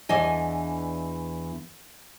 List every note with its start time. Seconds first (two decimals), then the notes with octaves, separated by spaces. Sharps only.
0.09 E2 E3 D4 D#5 G#5